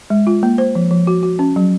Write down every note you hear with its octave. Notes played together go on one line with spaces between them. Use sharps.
G#3
F4
A#3
C5
F3
F3
F#4
F#4
C#4
F#3